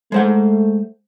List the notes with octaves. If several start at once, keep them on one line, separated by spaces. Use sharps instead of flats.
G#3 A3 C5 F#5